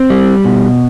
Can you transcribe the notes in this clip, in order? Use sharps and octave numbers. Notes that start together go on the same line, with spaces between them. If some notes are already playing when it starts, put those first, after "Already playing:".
Already playing: C4
G3
B2